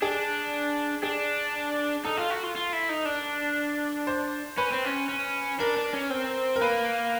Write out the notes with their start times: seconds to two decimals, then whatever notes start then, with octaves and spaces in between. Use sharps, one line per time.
0.02 D4 G#4
1.03 D4 G#4
2.05 D#4 A4
2.17 F4
2.30 F#4
2.43 F4
2.55 F4
2.73 E4
2.89 D#4
3.05 D4
4.07 C5
4.58 C#4 B4
4.72 C4
4.85 C#4
5.09 C#4
5.59 D4 A#4
5.77 D4
5.93 C#4
6.10 C4
6.56 A#4
6.62 A#3 B4